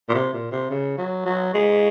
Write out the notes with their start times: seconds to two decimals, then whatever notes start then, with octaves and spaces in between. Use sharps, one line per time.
0.09 A#2
0.14 C3
0.33 A#2
0.52 C3
0.70 C#3
0.98 F#3
1.26 F#3
1.54 G#3